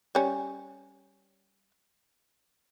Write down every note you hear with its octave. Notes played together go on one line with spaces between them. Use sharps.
G3 C#4